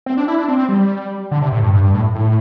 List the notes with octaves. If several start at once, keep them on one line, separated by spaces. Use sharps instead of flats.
C4
D4
E4
D4
C4
C4
G3
D3
C3
A2
G2
G2
G2
A2
A2